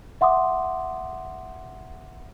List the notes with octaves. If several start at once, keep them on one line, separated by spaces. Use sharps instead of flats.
E5 F#5 C6 D6 D#6